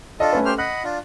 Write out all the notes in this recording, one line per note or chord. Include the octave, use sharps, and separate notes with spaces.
D4 F4 A4 D#5
A3 C#4 B4
G4 C5 F6
D#5 F#5 B5 F#6
D4 F4